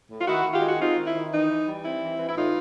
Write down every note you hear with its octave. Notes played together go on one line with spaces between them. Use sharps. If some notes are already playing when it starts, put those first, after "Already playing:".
A2
F4
D#3 E4 F#4
D#3
F4 G4
G#3
F#4
C4 D#4 F4
D#3
E4
D#3
E3 D#4
E3
G3
C4 E4
E3
E3
E4
A2 D#4 F4